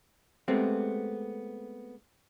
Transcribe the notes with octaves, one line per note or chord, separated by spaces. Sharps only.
G#3 A3 B3 C4 G4